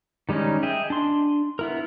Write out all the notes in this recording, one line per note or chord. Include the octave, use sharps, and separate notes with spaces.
D#3 G3 G#3 C#4 D#4
G#4 D#5 E5 G5
D4 C6
B3 E4 A#4